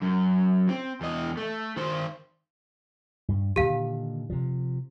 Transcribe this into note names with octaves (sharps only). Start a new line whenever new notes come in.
F#2
C4
E2 D#5
A3
D#3 C5
G2
A#2 D3 D#3 G4 F5
C3 F3